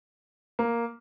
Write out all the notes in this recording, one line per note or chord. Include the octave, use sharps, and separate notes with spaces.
A#3